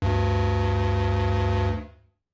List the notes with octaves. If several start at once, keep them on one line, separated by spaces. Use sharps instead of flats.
D2 G2